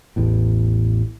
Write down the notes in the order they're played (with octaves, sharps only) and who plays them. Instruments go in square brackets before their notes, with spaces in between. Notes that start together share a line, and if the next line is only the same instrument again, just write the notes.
[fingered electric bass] A1 E2 A2